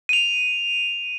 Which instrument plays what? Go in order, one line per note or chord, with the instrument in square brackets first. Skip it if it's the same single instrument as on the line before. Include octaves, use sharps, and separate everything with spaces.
[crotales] D#7 F7